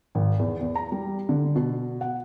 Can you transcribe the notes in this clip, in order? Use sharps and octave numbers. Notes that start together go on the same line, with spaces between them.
G#1
E2
E2
A#5
G3
D3
B2
F#5